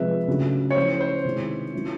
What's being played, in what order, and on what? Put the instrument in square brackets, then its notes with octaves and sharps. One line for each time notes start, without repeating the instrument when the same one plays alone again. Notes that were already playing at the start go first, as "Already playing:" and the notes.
Already playing: [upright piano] C3 F3 G#3 [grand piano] B4 E5
[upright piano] C#3 F#3 A3 D4
[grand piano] C#5
[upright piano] F3 A3 C#4 E4 [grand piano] C5
[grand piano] C5
[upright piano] C3 D#3 G#3 C#4 E4
F#3 A3 C#4 E4